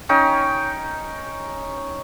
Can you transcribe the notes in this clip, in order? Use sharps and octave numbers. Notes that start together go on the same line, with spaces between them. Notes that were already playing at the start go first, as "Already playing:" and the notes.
C#4 D#4 G5